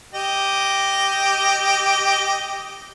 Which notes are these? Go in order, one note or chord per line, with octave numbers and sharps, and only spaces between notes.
G4 D#5